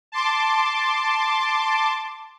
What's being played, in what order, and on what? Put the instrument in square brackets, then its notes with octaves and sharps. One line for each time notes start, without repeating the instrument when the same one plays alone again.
[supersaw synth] A5 C6 D6